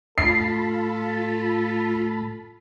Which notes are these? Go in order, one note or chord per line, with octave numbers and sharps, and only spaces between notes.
A2 F4 A4 A5 B5 C7